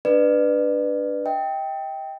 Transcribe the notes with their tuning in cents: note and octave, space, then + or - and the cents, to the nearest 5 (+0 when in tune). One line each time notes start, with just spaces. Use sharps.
D4 +0 B4 +0 D5 +30
D#5 +40 G5 +0